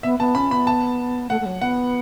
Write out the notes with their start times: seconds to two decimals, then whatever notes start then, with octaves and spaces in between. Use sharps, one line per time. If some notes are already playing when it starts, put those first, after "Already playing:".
0.03 B3 E5
0.19 B3 A5
0.35 C#4 B5
0.51 B3 B5
0.67 A5
1.30 A3 F#5
1.41 A3
1.46 F#3
1.61 B3 F#5